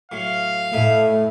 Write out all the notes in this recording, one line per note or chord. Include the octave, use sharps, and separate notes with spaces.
A2 F#3 F5
A2 A3 D#4 E4 E5